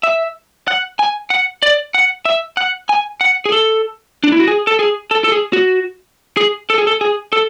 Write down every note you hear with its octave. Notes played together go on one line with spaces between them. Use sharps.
E5
F#5
G#5
F#5
D5
F#5
E5
F#5
G#5
F#5
G#4
A4
D4
E4
F#4
G#4
A4
G#4
A4
A4
G#4
F#4
G#4
A4
G#4
A4
G#4
A4